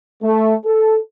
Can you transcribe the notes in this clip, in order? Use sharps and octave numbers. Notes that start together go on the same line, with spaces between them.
A3
A4